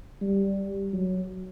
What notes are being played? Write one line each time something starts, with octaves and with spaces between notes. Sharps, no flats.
G3
F#3